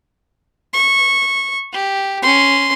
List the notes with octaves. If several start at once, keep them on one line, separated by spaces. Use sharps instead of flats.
C#6
G4
C#4 C6